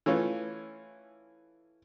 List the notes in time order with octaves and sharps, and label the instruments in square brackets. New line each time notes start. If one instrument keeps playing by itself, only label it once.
[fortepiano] E3 A3 C#4 F4